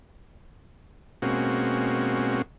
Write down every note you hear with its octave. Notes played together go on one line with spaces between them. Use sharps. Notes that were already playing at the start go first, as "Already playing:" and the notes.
B2 G#3 A#3 C4 C#4 F#4